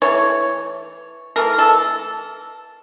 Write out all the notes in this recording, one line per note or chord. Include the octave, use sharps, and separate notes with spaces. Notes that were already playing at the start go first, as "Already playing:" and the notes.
E3 A3 C#5
E3 A3 A#4
A4